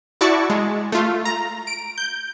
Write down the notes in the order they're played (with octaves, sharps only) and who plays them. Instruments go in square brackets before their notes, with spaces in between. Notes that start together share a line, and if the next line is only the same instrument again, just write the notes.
[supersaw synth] E4 F#4 D5 A5 C#6
G#3
A3 F4
A#5
D7
G6